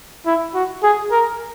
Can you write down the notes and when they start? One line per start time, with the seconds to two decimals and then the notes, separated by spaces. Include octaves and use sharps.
0.26 E4
0.54 F#4
0.83 G#4
1.11 A#4